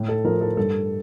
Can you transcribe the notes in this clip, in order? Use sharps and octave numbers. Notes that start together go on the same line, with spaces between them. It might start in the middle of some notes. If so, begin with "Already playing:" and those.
Already playing: A2
A4
F3 A#4
A4
G2 A4